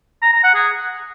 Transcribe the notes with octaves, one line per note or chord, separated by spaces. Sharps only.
A#5
A#5
F#5
G#4